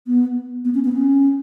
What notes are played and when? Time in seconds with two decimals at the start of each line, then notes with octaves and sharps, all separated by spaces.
0.07 B3
0.65 B3
0.75 C#4
0.84 B3
0.93 C#4